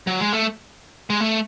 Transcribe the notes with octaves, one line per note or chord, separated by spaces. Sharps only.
F#3
G#3
A3
G#3
A3